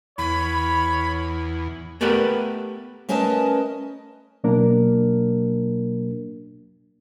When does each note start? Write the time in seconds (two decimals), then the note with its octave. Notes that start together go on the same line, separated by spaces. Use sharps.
0.18 E2 C#5 B5
2.01 A3 B3 G4 A#4 B4 D5
3.09 A3 C#4 A#4 B4 D#5 A5
4.44 B2 F#3 A#3 D4 A#4